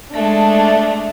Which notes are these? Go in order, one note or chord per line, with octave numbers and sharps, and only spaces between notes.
G#3 A3 D4